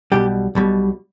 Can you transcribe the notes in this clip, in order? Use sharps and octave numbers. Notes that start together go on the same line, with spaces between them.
B1 B2 G3 G4
B1 B2 G3